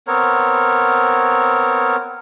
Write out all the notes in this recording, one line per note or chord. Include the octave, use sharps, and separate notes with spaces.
B3 C4 A#4 C#5